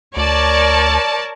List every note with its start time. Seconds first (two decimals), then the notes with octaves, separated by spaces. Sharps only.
0.17 D2 A#4 C#5 D5 A5